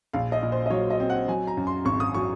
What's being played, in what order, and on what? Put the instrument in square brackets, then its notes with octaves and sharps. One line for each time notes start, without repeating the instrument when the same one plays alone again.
[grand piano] A#1 F5
D#5
A#2
C5
D#5
F#3 C#5
D#5
C4
F#5
F#3 G#5
A#5
F#2
C6
G#1 C#6
D#6
F#3 C#6